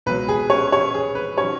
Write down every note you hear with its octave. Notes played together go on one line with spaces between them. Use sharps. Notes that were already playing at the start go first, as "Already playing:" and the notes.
C#2 B2 F#3 B4
G#4
C#4 C#5
C#4 C#5
G#4
B4
D#3 F#3 C#4 C#5